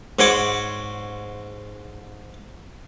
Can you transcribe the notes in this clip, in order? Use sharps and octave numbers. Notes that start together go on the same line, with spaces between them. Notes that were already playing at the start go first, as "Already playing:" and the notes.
G#2 F#4 C#5 C6 D6